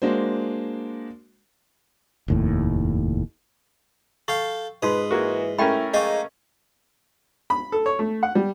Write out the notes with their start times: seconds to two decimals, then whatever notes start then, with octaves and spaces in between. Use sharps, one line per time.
0.02 G#3 A#3 D4 F#4 C5
2.28 F1 D#2 A2
4.28 A4 F5 G5 C#6
4.83 G#2 D#4 F4 B4 C6 D#6
5.11 E3 G#3 A#3 F#4
5.58 A3 C#4 E4 A#4 G5 B5
5.94 G#3 A#3 D#5 G5 G#5 C#6
7.50 B5
7.72 A4
7.86 C#5
7.99 A3
8.23 F#5
8.35 G3